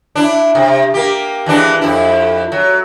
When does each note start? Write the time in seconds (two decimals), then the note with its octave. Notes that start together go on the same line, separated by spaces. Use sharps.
0.15 D4 E4
0.55 C3
0.94 A#3 G4
1.46 E3 G#3 D4
1.81 F2 E4
2.52 F#3